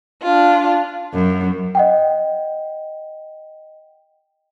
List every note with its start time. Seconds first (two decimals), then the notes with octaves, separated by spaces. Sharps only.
0.22 D4 F4
1.13 F#2
1.75 D#5 F#5 G5